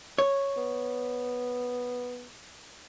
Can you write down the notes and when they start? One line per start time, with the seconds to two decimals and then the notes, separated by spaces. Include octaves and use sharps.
0.18 C#5
0.57 B3